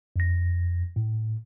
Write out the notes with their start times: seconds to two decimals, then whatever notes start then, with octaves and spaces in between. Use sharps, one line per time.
0.16 F2 A#6
0.96 A2